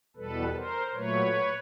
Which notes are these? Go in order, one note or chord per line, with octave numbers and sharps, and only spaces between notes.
E2 B2 G3 A4 B4
A#4 C5
A#2 F#3 A3 B4 C#5